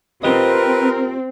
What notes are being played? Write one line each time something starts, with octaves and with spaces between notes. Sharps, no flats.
C4 F4 G4 A#4 B4 D#5